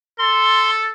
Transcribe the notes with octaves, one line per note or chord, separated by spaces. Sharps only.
A4 C6